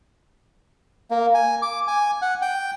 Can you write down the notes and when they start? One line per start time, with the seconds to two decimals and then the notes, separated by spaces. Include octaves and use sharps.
1.11 A#3
1.34 G#5
1.62 D6
1.88 G#5
2.22 F#5
2.42 G5